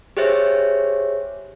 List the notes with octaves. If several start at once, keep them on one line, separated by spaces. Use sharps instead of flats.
G4 G#4 C5 C#5 E5